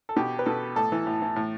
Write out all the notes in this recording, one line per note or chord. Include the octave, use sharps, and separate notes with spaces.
A4
B2 G4
B4
B2 A4
A2 A4
E3
A2
E3
A2